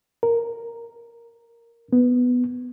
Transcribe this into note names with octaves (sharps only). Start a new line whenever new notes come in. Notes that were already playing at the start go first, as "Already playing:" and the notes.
A#4
B3